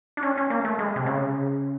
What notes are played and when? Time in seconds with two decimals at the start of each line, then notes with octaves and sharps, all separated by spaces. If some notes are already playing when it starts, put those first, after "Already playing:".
0.17 D4
0.23 C#4
0.37 C#4
0.50 A#3
0.65 A3
0.79 G#3
0.96 C3
1.06 C#3